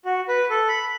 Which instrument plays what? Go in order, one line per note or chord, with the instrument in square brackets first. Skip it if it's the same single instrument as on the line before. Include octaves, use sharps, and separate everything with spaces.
[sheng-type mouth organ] F#4
B4
A4
B5